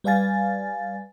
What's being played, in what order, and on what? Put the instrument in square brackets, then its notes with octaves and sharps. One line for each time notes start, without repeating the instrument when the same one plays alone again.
[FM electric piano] G3 B4 D5 F5 G#5 A6